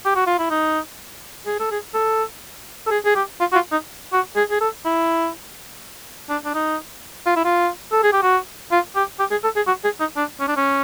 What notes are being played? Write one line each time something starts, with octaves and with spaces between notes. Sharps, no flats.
G4
F#4
F4
E4
D#4
G#4
A4
G#4
A4
A4
G#4
G#4
G4
F4
F#4
F4
D#4
F#4
G#4
G#4
A4
E4
D4
D4
D#4
F4
E4
F4
A4
G#4
G4
F#4
F4
G4
G4
G#4
A4
G#4
F#4
G#4
D#4
D4
C#4
D4
C#4